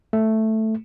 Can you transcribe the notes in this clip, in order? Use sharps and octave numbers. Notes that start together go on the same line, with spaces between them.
A3